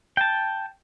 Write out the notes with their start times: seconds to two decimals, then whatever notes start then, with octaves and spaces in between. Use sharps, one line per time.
0.17 G5 A5